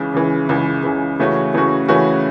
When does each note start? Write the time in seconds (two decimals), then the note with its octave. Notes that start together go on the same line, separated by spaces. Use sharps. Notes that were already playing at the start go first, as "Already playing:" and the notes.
Already playing: C#2 C#3 E3
0.14 C#2 C#3 E3
0.49 C#2 C#3 E3
0.84 C#2 C#3 E3
1.20 C#3 E3 A3 C#4 F#4
1.54 C#3 E3 A3 C#4 F#4
1.88 C#3 E3 A3 C#4 F#4